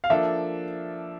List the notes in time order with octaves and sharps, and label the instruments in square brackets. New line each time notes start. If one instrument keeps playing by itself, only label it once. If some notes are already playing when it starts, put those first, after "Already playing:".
[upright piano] F5
[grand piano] F3 A#3 D4 A4 [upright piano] E5